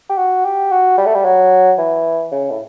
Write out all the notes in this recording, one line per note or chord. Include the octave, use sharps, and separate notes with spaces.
G4
F#4
G4
F#4
G3
A3
G3
F#3
E3
C#3
A2